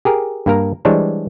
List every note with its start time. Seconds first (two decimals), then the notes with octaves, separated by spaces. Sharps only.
0.05 G4 G#4 A#4
0.46 G2 A#3 A#4 A#5
0.85 E3 G3 G#3 D4 C5 C#5